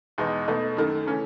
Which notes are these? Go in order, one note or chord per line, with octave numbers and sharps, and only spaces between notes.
E2 B2 G#3 D#4
B2 A3 D#4
F#2 D#3 A3
C#3 E3 A3 C#4